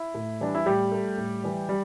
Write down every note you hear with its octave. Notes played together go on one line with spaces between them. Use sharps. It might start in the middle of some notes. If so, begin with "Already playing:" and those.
Already playing: E4
A2
E3 G3 D4
E4
A2 G3 G4
A3
A2
E3 G3
G3